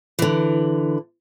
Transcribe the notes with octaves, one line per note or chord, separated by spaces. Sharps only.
D3 E3